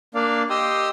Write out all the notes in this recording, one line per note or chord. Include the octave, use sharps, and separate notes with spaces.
A#3 D4 D5 F5
G4 D#5 G5 C6 D#6 E6